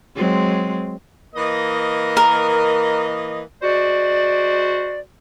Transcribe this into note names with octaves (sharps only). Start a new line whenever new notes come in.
F#3 G#3 C4
E3 A#3 D#5
A#4
G#3 F#4 C5 D5